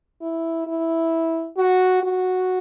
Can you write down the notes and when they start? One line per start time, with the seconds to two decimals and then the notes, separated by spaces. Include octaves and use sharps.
0.21 E4
0.67 E4
1.57 F#4
2.03 F#4